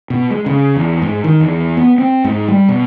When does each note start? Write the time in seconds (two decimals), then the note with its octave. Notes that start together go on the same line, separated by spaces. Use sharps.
0.10 B2
0.31 G#3
0.46 C#3
0.76 E2
1.02 G#2
1.24 D#3
1.40 E2
1.77 B3
1.98 C4
2.24 G#2
2.48 G3
2.69 B2